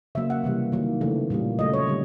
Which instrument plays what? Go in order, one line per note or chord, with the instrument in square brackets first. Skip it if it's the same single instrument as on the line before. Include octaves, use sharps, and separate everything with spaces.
[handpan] C#3 F#3 A#3 E5
F#5
C3 E3 G3 A#3
D#3 F#3 A#3
C#3 E3 A3
A#2 G3 A#3
C#3 F#3 A3 D#5
C#5
D3 G3